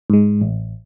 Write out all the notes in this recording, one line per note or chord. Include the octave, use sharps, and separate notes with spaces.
G#2 G#3
A1